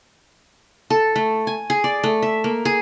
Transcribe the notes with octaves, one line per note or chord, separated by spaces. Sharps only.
A4
A3
G#5
G#4
D5
A3
E5
A#3
G#4